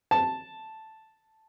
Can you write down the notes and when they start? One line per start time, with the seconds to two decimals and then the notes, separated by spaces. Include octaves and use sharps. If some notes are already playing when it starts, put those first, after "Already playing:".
0.11 A5